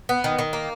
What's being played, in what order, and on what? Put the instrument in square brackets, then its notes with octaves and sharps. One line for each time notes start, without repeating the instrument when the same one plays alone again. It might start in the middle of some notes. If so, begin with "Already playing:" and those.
[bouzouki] B3
D#3
D#3
A#3